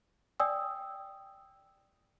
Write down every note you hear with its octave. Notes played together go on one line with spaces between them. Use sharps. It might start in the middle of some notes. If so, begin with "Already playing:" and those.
D5 G5 G#5 D#6 E6